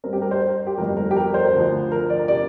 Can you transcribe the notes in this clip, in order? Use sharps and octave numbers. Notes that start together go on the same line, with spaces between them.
G2 G3 C4 A#4
G4
A#4
C5
G4
G1 F2 F3 A#4
A#4
G4
A#4
C5
D2 D3 F3
A#4
D5
C3 D5